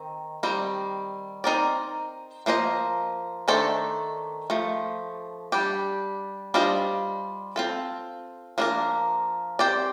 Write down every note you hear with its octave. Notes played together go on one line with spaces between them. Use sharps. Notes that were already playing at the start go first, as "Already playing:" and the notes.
Already playing: D#3 C4 D#4
D#3 G3 C4
C4 D#4 A#4 D5
F3 A#3 F4 C5 D#5
D#3 A3 D4 A4 C5
F3 A3
G3 D4 G4
G3 D4 F4 C5 D#5
C4 F4 A4
F3 A#3 D4 F4 A#4
C4 G4 D5